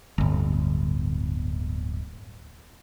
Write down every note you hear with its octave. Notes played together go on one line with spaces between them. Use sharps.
D1 G1